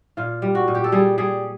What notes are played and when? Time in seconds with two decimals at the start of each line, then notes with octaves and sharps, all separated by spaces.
0.17 A#2 F4
0.42 G3
0.55 F#4
0.68 A#2
0.75 G4
0.84 A4
0.92 G3 G#4
1.18 G3 G#4